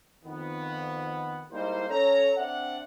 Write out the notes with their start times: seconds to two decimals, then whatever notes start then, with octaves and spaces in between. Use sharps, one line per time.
0.25 F2 D#3 B3
1.52 G3 G#3 A#3 D#4 E4 C5
1.90 C#4 A4 C#5 A#5
2.37 C4 D4 D5 E5 F#5